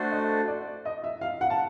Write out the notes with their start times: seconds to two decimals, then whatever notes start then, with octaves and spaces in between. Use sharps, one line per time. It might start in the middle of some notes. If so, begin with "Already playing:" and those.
Already playing: A3 D4 F#4 A4 C5
0.12 D#5
0.48 D5
0.85 D#5
1.04 E5
1.21 F5
1.41 F#5
1.50 A5